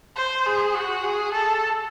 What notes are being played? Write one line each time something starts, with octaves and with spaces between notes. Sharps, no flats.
C5
G#4
F#4
G#4
A4